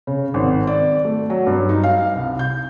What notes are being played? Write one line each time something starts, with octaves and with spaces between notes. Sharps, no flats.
C#3
G#1
D5
A3
F#3
G2
D#4
F5
C2
G6